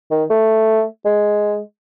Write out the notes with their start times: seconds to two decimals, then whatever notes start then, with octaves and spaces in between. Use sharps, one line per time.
0.11 D#3
0.30 A3
1.05 G#3